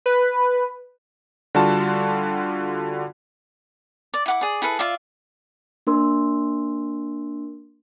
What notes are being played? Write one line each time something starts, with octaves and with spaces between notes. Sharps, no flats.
B4
D3 G3 F4 F#4 A5
D5
E4 F#5 D6
G#4 D5
E4 G#4 A4 B4
F4 D5 E5 F5
A#3 D4 A#4 C6 E6